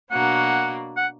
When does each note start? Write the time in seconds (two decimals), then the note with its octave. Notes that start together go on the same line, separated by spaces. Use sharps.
0.11 B2 F#3 A#3 D4 F#5
0.97 F#5